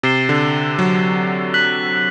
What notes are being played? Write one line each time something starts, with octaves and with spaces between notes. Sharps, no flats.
C3 A6 C7 E7 G7
D3
F#3
F#6 B6 F#7